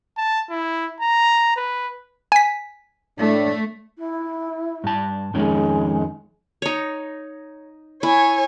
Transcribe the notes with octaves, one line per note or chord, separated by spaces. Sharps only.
A5
E4
A#5
B4
G#5 B6
A2 A3 D4
E4
G2 A5
F2 D#3 G#3 C#4
D#4 C#5
E4 C#5 G#5